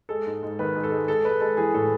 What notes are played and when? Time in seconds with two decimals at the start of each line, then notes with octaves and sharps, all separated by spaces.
0.09 G#3 A4
0.27 G#2
0.43 G#2
0.59 D#3 B4
0.75 G#2
0.83 A4
0.92 G#3
1.08 G#3 A4
1.24 G#3 B4
1.40 G#3 A4
1.57 E3 G#4
1.74 A2 A4